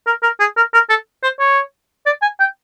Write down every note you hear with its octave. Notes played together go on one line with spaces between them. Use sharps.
A#4
A#4
G#4
A#4
A#4
A4
C5
C#5
D5
G#5
G5